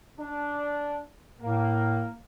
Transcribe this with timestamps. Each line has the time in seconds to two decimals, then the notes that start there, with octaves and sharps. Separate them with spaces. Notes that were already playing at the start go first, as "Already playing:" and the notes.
0.20 D4
1.41 A2 A#3